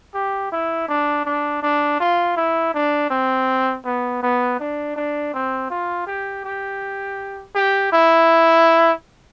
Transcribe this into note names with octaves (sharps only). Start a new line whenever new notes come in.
G4
E4
D4
D4
D4
F4
E4
D4
C4
B3
B3
D4
D4
C4
F4
G4
G4
G4
E4